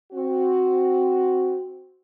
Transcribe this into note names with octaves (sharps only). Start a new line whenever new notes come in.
C4 F#4